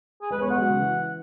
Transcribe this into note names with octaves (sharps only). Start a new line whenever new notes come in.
G#4
G#3 B4
B3 C#5
G#3 F#5
F#3
C#3
E3